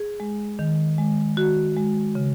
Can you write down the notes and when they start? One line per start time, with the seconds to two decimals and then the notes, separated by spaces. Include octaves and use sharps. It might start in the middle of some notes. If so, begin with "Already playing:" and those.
Already playing: G#4
0.20 G#3
0.59 D#3
0.98 G#3
1.37 D#3 F#4
1.77 G#3
2.15 C#3